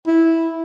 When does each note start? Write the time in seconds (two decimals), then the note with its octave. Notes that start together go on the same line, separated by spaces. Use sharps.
0.07 E4